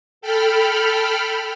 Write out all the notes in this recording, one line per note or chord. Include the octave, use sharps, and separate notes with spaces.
A4 G5 B5 F6